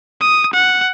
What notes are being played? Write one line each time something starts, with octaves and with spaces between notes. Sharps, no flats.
D#6
F#5